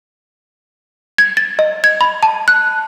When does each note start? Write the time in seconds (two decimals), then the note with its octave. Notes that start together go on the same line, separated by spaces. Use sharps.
1.18 G#6
1.37 A6
1.59 D#5
1.84 G#6
2.01 B5
2.23 A5
2.48 F#6